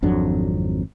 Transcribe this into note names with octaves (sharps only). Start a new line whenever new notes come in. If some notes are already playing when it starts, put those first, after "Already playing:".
G#1 F2 F#3 D4